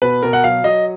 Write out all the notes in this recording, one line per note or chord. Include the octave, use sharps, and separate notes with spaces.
B2 B4
B2 A#4
F#5
F#3 F5
F#3 D#5